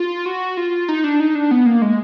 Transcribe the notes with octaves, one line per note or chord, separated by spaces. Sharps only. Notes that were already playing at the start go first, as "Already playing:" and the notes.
Already playing: F4
F#4
F4
D#4
D4
D#4
D4
B3
A#3
G#3